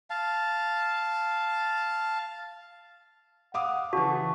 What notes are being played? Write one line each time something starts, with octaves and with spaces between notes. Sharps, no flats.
F5 A5
F5 F#5 D6 D#6
C#3 E3 F#4 A5